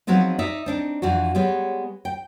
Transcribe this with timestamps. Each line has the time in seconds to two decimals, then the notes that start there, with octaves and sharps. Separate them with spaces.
0.07 F3 F#3 G#3 B3 C4 D#4
0.39 D#4 D5 E5
0.66 C4 D4 D#4
1.02 F2 E3 D4 F#4
1.35 G3 G#3 B3 C#5
2.05 G5